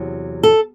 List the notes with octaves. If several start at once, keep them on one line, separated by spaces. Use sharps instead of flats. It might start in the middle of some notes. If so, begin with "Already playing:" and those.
Already playing: E2 C3 F#3
A4